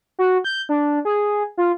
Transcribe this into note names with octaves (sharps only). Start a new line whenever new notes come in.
F#4
G6
D4
G#4
F4